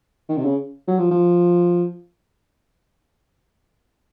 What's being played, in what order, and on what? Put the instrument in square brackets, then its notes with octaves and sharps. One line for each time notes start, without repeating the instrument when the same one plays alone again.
[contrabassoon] D#3
C3
C#3
F#3
F3
F3